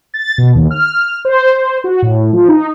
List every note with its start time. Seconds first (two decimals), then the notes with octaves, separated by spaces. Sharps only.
0.14 A6
0.38 B2
0.55 D#2
0.71 F6
1.25 C5
1.84 F#4
2.02 A2
2.33 F3
2.48 D#4